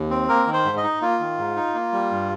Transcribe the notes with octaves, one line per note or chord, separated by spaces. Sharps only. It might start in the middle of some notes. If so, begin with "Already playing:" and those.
Already playing: D#2
C4
A#3 A#4
D#3
C5
G#2
D#5
D#4
A#3 F4
D#3
G#2
D#4
A#3
G3
G2